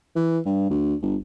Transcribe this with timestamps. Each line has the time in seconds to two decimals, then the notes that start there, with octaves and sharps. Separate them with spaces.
0.16 E3
0.46 G2
0.70 D2
1.02 G1